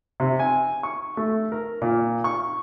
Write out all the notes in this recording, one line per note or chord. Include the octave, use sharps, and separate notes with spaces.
C3
G#5
C#6
A3
A#4
A#2
C#6